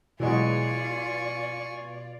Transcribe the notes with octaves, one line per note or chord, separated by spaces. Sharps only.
B2 E3 F#3 G#3 F4 D5 G#5 C#6